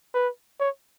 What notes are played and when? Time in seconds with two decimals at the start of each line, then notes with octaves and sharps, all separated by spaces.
0.14 B4
0.60 C#5